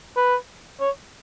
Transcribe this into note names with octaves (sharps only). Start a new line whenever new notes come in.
B4
C#5